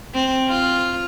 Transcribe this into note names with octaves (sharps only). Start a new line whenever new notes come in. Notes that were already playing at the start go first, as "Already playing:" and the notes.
C4
F4